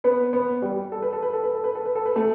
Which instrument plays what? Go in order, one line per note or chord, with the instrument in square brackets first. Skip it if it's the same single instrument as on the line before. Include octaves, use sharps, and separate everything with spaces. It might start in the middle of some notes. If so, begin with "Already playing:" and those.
[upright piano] B3 B4
B3 B4
G3 G4
A4
B4
A4
B4
A4
B4
A4
B4
A4
B4
A4
B4
A3 A4